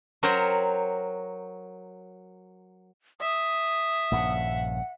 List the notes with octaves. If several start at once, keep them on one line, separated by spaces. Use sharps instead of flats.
F#3 A#4 C5 C#5 G5 A#5
E5 D#6
A#1 G2 C#3 F#5